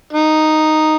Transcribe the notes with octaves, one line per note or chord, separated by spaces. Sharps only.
D#4